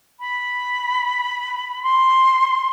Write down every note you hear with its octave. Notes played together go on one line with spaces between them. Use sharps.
B5
C6